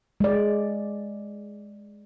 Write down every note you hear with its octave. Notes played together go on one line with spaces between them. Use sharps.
G#3 D5